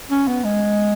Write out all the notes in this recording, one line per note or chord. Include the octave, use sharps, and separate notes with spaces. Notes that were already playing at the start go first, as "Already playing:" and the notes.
C#4
B3
G#3